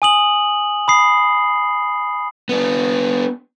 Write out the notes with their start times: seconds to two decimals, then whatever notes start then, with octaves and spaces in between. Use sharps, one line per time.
0.02 G#5 D#6 F#7
0.88 B5 D#6 C7
2.49 B3 D4